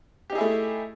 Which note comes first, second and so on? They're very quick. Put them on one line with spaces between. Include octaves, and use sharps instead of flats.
G4 D#4 G#4 E4 A3